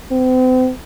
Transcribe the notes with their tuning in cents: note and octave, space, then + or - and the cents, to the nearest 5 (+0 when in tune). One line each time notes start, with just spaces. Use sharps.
C4 -40